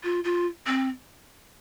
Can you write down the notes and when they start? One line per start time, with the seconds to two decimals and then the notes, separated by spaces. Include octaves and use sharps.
0.03 F4
0.24 F4
0.67 C4